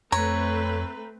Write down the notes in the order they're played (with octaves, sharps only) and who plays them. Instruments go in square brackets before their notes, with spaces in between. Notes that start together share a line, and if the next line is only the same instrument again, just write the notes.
[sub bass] F2 [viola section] A3 C4 B4 [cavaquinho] C#5 [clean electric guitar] A#5